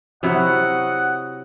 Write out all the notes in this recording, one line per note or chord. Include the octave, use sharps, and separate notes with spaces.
C3 F#3 E4 F#4 D#5 F#5